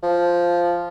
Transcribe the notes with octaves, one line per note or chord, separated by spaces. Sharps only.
F3